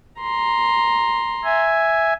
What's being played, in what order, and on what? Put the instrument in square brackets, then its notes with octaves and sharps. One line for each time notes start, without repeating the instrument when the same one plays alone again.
[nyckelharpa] A#5 C6
[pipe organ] E5 G#5